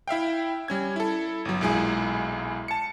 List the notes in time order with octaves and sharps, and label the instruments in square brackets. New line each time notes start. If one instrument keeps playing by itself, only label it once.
[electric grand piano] E4 E5 F5 G5
G3 C#4 G#6
E4 A4
G1 F#3
B1 A#2 G#3 E4 G#4
A5 C#7